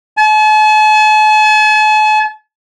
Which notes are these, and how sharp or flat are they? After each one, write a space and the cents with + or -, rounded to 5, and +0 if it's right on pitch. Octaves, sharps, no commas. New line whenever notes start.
A5 -45